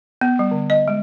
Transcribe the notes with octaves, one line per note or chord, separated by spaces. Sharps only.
B3
G3
D3
D#5
G#3